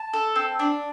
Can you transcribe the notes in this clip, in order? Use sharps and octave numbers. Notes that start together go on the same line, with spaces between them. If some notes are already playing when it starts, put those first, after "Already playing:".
Already playing: A5
A4
C4
D4